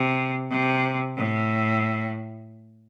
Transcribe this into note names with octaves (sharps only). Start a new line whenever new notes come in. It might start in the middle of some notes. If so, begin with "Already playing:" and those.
Already playing: C3
C3
A2